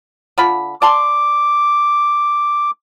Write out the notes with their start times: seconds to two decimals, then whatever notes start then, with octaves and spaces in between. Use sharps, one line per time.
0.38 D3 F4 B5
0.82 D5 A5 C6 D6